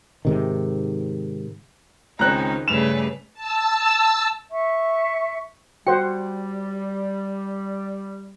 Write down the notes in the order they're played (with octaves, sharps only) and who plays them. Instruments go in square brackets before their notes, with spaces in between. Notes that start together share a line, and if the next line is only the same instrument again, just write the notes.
[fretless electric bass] G#2 C3 D#3
[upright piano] C#2 C4 [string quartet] D#3 C#4 D#4 [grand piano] A#5 F#6
[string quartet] G2 B4 [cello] C#3 A3 [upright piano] E7 F7
[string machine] A5 E6
[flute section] E5 C#6
[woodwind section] G3 [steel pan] F#4 C5 F#5 [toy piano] G5